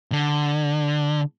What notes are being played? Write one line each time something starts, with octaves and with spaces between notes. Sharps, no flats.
D3